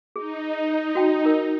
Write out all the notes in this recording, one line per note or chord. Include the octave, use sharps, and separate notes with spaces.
D#4 G#4
F#4 G5 A5
A#4